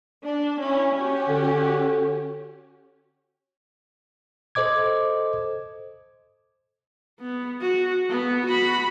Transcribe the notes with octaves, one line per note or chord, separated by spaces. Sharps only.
D4
C#4 E4
C#4 F#4 G4
D3
A4 C5 D#5 D6 G#6
B3
F#4
B3
F#4 B5